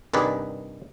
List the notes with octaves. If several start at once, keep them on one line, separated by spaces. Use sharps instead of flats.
C2 G2 D#3 G#4 B4 D5